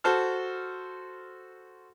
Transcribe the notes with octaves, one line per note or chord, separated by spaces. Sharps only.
F#4 A4 C5 A5 F6